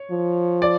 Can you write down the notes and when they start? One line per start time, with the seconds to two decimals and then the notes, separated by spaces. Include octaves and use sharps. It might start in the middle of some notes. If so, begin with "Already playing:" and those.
Already playing: C#5
0.11 F3
0.62 D5